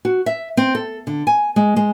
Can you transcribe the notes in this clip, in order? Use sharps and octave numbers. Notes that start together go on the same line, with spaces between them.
F#4
E5
C4
A4
D3
G#5
G#3
G#3